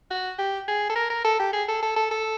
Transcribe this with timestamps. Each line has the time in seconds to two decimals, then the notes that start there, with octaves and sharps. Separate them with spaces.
0.10 F#4
0.39 G4
0.68 G#4
0.90 A4
0.96 A#4
1.10 A#4
1.25 A4
1.40 G4
1.53 G#4
1.68 A4
1.82 A4
1.96 A4
2.11 A4